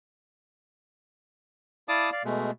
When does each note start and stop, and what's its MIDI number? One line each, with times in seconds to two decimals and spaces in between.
1.89 2.10 64
1.89 2.10 74
1.89 2.10 77
1.89 2.10 81
1.89 2.10 86
1.89 2.10 87
2.12 2.23 74
2.12 2.23 77
2.25 2.51 47
2.25 2.51 56
2.25 2.51 57